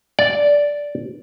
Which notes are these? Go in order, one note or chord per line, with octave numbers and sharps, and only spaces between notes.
D5